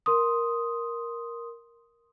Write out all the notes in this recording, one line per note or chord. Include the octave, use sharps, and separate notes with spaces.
A#4 C6 D#6